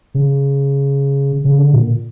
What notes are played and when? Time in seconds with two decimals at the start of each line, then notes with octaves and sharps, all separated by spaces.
0.14 C#3
1.44 C#3
1.58 D3
1.73 A#2